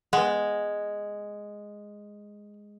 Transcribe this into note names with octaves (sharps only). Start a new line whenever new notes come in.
G#3 B3 F#5